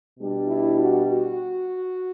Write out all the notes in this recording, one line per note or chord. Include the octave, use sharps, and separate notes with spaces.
B2 G3 D4
E4
F#4
F#4